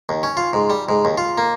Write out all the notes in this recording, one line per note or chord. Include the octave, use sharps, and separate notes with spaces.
D#2
C#4
F4
G#2
G3
G#2
D#2
F4
A#3